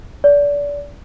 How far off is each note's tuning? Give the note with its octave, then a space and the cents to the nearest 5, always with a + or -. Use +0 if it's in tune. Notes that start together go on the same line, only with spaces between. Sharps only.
D5 -30